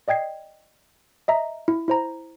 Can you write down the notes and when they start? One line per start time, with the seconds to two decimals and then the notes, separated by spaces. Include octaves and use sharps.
0.08 D5 D#5 G5 G#6 C7
1.28 D#5 E5 A#5
1.68 E4
1.88 E4 C5 A#5